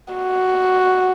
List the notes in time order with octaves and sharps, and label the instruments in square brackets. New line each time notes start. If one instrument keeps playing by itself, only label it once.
[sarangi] F#4